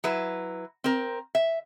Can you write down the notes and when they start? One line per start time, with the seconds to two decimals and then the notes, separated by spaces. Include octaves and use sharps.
0.04 F#3 E4 B4
0.84 C4 A#4
1.35 E5